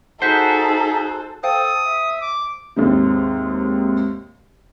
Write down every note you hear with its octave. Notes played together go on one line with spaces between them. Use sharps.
D#4 F#4 G#4 A4 C5 F#5 G6 B6
A4 C5 F5 G5 D#6
E5
D6
D#2 G#2 C3